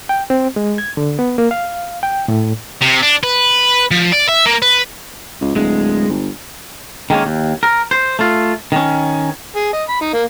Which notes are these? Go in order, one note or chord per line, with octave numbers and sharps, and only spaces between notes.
G5
C4
G#3
G#6
D3
B3
A#3
F5
G5
A2
C3
D4
B4
F3
D5
E5
A#3
B4
C#2
D1 G#3
G1
D#3 G#3 A#3 C#4
D#2
A#4
C5
A3 F4
D#3 C#4
G#4
D#5
B5
D#4
A#3